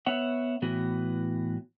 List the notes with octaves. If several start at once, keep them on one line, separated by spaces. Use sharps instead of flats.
B3 C#5 E5 F#5
A2 E3 B3 F#4